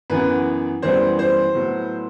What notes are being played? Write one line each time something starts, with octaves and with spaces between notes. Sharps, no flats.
F#2 E3 B3 B4
F#2 E3 G3 B3 C5
C5
A2 F#3 B3